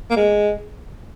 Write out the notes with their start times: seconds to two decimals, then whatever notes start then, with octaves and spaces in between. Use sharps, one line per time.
0.10 A#3
0.16 G#3